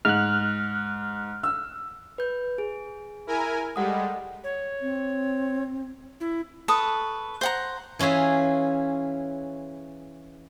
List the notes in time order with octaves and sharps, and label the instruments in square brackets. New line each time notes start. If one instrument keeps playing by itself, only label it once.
[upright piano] G#2 [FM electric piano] F6 F#6
[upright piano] E6
[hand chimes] B4 G6
G#4
[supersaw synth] E4 A#4 G#5
[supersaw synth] G3 G#3 [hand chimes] A4 F#5 D#6
[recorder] C#5
[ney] C4
[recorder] E4
[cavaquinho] A4 B4 C#6 D#6
C5 F#5 A#5
[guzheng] E3 C#4 F4 G#4 E5